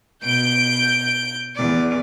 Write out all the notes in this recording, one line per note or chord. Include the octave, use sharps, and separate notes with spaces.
B2 G6 D7
E2 D5